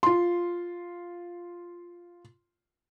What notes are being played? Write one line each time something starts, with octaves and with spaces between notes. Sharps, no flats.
F4 C6